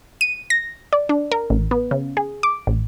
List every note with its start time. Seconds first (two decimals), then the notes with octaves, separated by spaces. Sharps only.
0.21 D#7
0.50 A#6
0.93 D5
1.09 D4
1.32 A#4
1.50 A1
1.71 B3
1.91 C#3
2.17 G#4
2.43 D6
2.67 A1